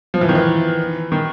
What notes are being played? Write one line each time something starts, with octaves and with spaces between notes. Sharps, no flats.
F3
E3
D#3
E3
D#3